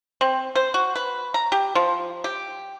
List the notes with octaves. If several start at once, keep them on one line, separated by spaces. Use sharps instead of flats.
C4
C5
F#4
B4
A#5
G4
F3
G4